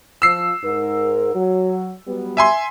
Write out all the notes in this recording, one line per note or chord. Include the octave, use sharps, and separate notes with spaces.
F3 E6 C7
G#2 A#4
F#3
F#3 G3 B3
E5 G#5 C6